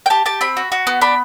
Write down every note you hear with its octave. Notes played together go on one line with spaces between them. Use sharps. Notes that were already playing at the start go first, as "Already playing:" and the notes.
G5
G4 A5
G4 A5
C4 B5
F#4
F#4
B3
D4 B5